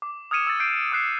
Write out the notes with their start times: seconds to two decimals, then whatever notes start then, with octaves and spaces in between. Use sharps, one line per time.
0.02 D6
0.31 D#6 F6 G#6 C#7 D#7 E7
0.47 E6 A6
0.60 G6 C7 D7
0.92 D#6 F#6 C7 E7